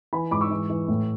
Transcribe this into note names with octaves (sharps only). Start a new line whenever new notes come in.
E3 G#5 B5
G#2 B5 D6
C#6 E6
E3
E3
A2